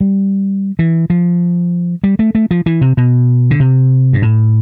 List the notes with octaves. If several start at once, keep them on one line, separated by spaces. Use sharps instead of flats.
G3
E3
F3
G3
A3
A3
F3
E3
C3
B2
D3
C3
G2
A2